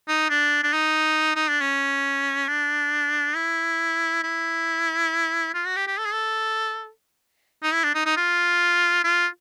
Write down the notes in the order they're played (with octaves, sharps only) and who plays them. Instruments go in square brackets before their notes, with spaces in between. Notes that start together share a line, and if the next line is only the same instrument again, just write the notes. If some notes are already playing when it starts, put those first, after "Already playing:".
[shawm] D#4
D4
D4
D#4
D#4
D4
C#4
D4
E4
E4
F4
F#4
G4
G4
A4
G#4
A4
D#4
E4
D4
D#4
D#4
F4
F4